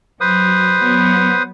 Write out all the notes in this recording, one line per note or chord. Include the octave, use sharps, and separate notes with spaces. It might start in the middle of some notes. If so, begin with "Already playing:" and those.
F#3 B4 C5 D#6
F#3 B3